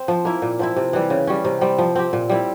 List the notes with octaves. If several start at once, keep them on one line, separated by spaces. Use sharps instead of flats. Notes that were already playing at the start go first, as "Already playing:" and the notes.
Already playing: C4
F3
A#3 E4
A#2
F3 C4 E4
C3
E3 G3
C#3
G3 C#4
C3
G3 C4
F3
C4 G4
A#2
G3 C4 E4